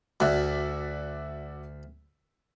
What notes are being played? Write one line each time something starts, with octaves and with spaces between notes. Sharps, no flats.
D2 F#4 D5 E5